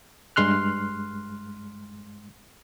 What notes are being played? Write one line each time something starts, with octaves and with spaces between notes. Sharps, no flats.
G2 G#3 C6 F6 F#6